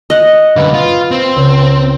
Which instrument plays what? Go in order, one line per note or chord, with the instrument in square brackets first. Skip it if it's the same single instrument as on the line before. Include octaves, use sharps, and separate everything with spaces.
[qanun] D#5 F#5
[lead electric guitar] F#2 D3 [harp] B4 F5 B5
[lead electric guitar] F4
C4
[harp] C#2 C#5 E7